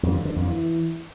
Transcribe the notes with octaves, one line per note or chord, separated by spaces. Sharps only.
F2
D3
D3
F2
E3